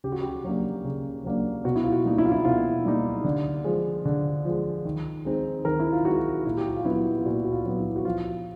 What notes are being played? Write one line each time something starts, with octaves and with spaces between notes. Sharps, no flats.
C#3 G4
F#4
G4
F#3 A#3 D4
C#3
F#3 A#3 D4
B2 F#4
E4
F4
F#4
G3 A#3 D#4
E4
F4
E4
B2 F4
G3 A#3 D#4
D3
F3 G#3
D3
F3 G#3
D#3
G#3 C4 D#4
D#3 A#4
E4
F4
G#3 C4 D#4 F#4
A#2 E4
G4
F#4
F4
F#3 B3 E4
F4
F4
A#2 F#4
F#4
F4
F#3 B3
E4
F#4
F3 F4